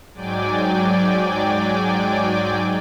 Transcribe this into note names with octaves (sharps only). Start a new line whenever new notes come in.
G#2 F#3 D5 G5 G#5 D6